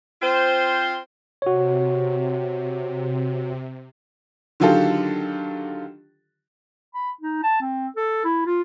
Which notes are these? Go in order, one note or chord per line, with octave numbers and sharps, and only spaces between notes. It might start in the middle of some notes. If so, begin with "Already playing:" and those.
C4 F4 C5
C3 F#4 C#5
D3 D#3 F#3 F4 G4 A4
B5
D#4
A5
C4
A4
E4
F4